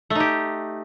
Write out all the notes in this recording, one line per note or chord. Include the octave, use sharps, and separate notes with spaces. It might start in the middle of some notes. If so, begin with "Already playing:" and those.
A3 D#4 G4